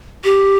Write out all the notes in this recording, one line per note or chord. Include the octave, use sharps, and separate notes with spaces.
G4